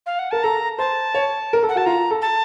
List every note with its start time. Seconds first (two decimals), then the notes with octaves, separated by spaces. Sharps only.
0.06 F5
0.19 F#5
0.31 A#4 A5
0.43 A4 A#5
0.78 C5 A5
1.14 C#5
1.53 A#4
1.63 A4
1.69 F#5
1.75 F#4 A5
1.86 F4 A#5
2.11 A4
2.22 A5